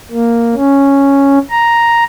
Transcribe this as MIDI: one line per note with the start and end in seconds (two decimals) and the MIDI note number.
0.11 0.55 58
0.55 1.39 61
1.51 2.04 82